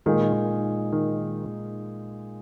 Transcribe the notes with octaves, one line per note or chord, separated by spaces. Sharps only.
A#2 D#3 G#3 D#4 G#4
D#3